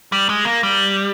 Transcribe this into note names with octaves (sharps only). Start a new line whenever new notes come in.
G3
G#3
A#3
G3